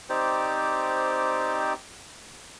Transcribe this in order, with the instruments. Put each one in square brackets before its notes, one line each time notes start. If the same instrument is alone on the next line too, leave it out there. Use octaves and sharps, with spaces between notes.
[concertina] C4 D#4 G4 C5 D5